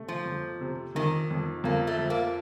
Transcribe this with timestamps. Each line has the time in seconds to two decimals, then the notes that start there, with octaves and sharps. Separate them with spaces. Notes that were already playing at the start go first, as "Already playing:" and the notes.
Already playing: C3 A3
0.08 F3
0.26 F2
0.61 C3
0.95 F2 D#3
1.31 F2
1.64 F2 A#3
1.87 A3
1.99 F3
2.10 A#3